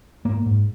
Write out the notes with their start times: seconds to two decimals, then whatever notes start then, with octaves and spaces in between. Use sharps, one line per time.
0.25 G#2 A#3
0.46 G#2